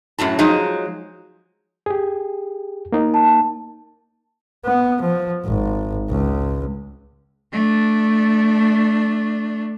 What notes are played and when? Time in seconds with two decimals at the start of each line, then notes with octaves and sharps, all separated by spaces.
0.19 F#2 A2 F#3 A5
0.39 F3 F#3 G#3 D#4
1.86 G4 G#4
2.92 A#3 D#4
3.14 A5
4.66 B3
5.01 F3
5.46 G#1
6.10 C#2
7.53 A3 D4